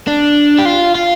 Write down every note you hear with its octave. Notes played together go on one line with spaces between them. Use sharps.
D4
G4
F4
F4